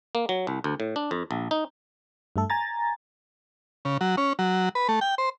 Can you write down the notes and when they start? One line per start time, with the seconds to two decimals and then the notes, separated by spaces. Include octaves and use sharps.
0.15 A#3
0.29 F#3
0.47 C2
0.64 D2
0.80 A2
0.96 D4
1.11 F2
1.31 A#1
1.51 D#4
2.36 G2 A3 A4
2.50 G#5 A#5 A6
3.85 C#3
4.01 F#3
4.17 C#4
4.39 F#3
4.75 B4
4.89 A3
5.01 G5
5.18 C5